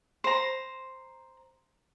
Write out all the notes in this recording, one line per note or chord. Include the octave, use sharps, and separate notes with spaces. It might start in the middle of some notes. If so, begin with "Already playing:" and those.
C5 A#5